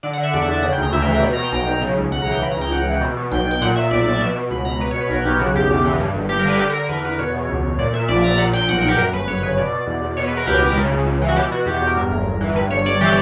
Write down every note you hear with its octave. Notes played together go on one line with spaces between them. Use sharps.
D3 D5
F#5
D3
E5
E2 D5
E5
E2
E5
C#3 F#5
G5
D2 A#5
D2 E5
G5
E3 A#5
B2 B5
A#5
B2
G5
B1 A#5
B1
C#3
C#2
C#2 F#5
A#5
E3
G5
C#3 B5
A#5
C#2 G5
C#2 F#5
E3
B2
B2
B1 G5
B1
G5
A#2 F#5
A#2 E5
B1 D5
B1
B2 E5
B2
C#2 B5
C#2 A#5
B2 B4
C#5
B2 B4
B1 A#4
B1 G4
C#3 F#4
E2 G4
E2
E3
G2
G1
G1 G4
A#4
D3 B4
D3 G4
A#4
D3
A#4
E2 B4
E2 B4
B2 C#5
B2
C#2
C#2
A#2 D5
A#2 E5
A#1 D5
A#1 A#5
A#2 F#5
A#2 G5
B1 F#5
A#4
B1
G4
F#2 A#4
G1 B4
G1 C#5
C#3 B4
B2 D5
B2
E2
E2
B2 C#5
B4
B2
A#4
C#2 G4
C#2
C#3
C#2
C#2
E3
F#4
B2 G4
B2 F#4
E2 G4
G4
E2
A#4
G2
G1
G1
E3
G2 B4
G1 C#5
G1 D5
E3 G4